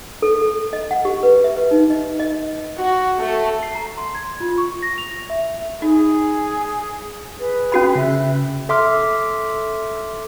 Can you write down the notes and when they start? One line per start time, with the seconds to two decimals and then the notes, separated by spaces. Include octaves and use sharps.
0.22 A4
0.41 A4
0.73 D#5
0.91 F#5
1.05 G4
1.23 B4
1.44 E5
1.57 B4
1.71 D#4
1.90 D#5
2.19 D#5
2.77 F#4
3.20 A3
3.63 C7
3.75 A#5
3.98 C6
4.15 G#6
4.40 F4
4.58 C#6
4.82 A#6
4.98 F7
5.30 E5
5.82 D#4 G#4
7.39 G#4 B4
7.72 C#4 F#4 B5
7.95 C#3 E5 F#6
8.69 A4 E5 C6 D6 F6